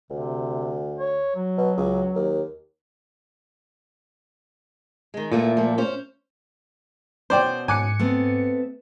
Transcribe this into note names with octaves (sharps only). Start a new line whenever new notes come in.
D2 C3
C#5
F#3
B2
C#2
D#2
D#3 G#3
A#2 E3 A3 F4
F3 A3
C#4 C5
B2 C#4 C5 D5 G5
G#2 G#5 D6 F#6 C#7
A3 B3 C4